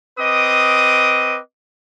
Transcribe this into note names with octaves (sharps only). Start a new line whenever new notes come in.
C4 B4 D#5 D6 D#6